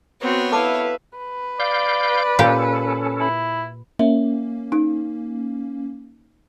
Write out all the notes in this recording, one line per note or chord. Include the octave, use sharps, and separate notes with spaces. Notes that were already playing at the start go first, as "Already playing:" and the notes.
B3 C4 F#4 C#5
E4 A4 B4 E5 F5 A5 D6
B4
D5 F5 G6
A#2 C#4 G4 A4
E4
A#3 C#4 E5
D#4